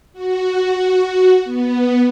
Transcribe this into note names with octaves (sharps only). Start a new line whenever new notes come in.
F#4
B3